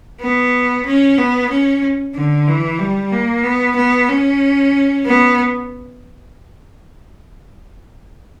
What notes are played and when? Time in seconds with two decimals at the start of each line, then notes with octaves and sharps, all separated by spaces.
0.21 B3
0.86 C#4
1.18 B3
1.50 C#4
2.15 D3
2.47 E3
2.79 G3
3.12 A#3
3.44 B3
3.76 B3
4.09 C#4
5.05 B3